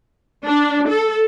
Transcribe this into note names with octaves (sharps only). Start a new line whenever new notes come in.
D4
A4